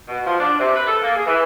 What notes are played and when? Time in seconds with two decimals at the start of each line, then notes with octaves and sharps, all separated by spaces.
0.08 B2
0.25 F3
0.40 D4
0.59 C3
0.75 B4
0.86 A4
1.02 A#3
1.15 G#4
1.26 E3